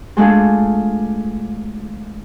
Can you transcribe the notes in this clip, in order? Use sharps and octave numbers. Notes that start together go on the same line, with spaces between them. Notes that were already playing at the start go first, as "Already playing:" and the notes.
G#3 A3 D4 F4 G#4